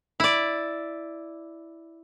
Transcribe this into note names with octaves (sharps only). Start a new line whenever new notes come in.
E4 D5